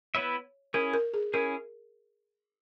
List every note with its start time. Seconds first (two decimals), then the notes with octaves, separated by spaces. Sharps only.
0.15 B3 E4 B4 C#5 E5
0.74 C#4 E4 G#4 A#4
0.94 A#4
1.14 G#4
1.34 C#4 E4 G#4 A#4